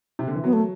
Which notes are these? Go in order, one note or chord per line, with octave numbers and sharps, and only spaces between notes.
C3
D3
E3
F#3 B3
A3